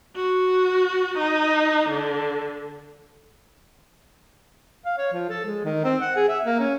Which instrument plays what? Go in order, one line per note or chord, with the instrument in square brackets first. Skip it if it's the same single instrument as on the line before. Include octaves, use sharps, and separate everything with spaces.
[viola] F#4
D#4
D3
[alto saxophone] F5
C#5
F3
A4
G#3
D#3
C4
F#5
G#4
E5
A#3
C#4